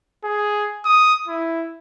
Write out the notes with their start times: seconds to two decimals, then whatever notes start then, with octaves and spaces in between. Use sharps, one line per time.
0.24 G#4
0.85 D#6
1.28 E4